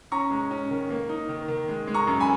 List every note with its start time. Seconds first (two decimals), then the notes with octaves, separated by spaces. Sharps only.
0.12 C#4 A#5 C#6
0.31 G#3
0.51 C#4
0.70 D#3
0.90 A#3
1.09 D#4
1.29 D#3
1.48 D#3
1.68 G#3
1.87 G#3
1.94 A#5 C#6
2.07 F#2
2.20 G#5 B5